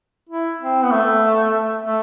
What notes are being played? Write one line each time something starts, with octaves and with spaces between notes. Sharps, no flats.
E4
C4
B3
A3
A3